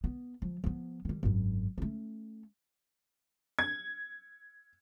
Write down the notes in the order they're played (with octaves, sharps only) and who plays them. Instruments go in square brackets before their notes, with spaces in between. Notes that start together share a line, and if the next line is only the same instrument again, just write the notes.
[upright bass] B3
F3
F3 B3
D#3 G3
G#1 F#2
A3 C#4
[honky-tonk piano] G#6